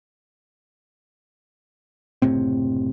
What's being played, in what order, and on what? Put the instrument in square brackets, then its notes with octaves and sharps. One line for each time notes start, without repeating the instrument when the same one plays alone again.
[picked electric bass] F#1 A2 C3 C4